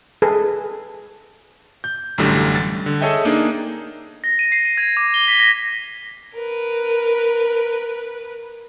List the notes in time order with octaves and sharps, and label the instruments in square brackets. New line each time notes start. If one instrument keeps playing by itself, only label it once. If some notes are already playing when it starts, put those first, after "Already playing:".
[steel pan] G#4 A4 B4
[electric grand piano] G6
A1 F#2 A2 D3 G3
A6
D3
G#4 A4 C#5 D#5 E5 G5
A#3 D4 D#4 G#4
[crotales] A#6
D#7
C7
D#7
G#6
D6
G7
B6
A#6
[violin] A#4 B4